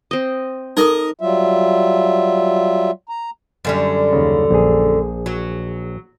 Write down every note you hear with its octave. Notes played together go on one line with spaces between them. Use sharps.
C4 D#5
D#4 A4 A#4 D#5 D#6
F#3 G3 F4 E5
A#5
F#2 D3 G3
D#2 C#3
A#1 G#4
F#3